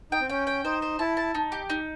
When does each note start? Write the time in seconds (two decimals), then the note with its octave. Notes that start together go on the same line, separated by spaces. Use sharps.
0.12 D#4 G5
0.21 C4
0.29 C#4 G5
0.47 G5
0.65 D#4 C5
0.82 C5
0.99 E4 A5
1.17 A5
1.35 D#4
1.52 G4
1.70 D#4